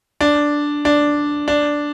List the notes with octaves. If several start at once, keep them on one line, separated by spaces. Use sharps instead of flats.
D4
D4
D4